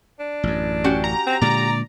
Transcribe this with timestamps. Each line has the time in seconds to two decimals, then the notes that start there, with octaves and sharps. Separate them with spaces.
0.20 D4
0.43 A1 F#2
0.84 C#4 F#4 G4
1.04 A#5
1.27 C4
1.42 A#2 D3 G#3 D5 A#5